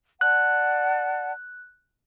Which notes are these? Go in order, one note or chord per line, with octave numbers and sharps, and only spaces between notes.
D5 F#5 A5 F#6